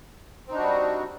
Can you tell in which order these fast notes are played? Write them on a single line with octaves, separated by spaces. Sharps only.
C4 D#4 D4 F#4 G3